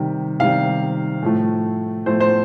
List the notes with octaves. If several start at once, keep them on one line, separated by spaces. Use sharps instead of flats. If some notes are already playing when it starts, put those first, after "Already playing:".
Already playing: C3 D#3 G3
C3 D#3 G3 F5
A2 F3 A3
A2 F3 A3 C5
C5